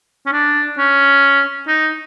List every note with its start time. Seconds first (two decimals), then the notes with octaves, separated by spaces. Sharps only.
0.26 C#4
0.32 D4
0.78 C#4
1.67 D#4